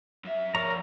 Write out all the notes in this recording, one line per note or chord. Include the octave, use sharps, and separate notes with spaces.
F#2 E5
F3 A#4 C#5 D5 A#5